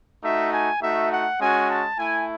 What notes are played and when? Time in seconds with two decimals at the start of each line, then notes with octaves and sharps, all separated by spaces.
0.22 A3 D#4 F#4 E5
0.52 G#5
0.81 A3 D#4 F#4 E5
1.10 F#5
1.39 G#3 C#4 F#4 G#5
1.69 A5
1.98 A3 E4 G#5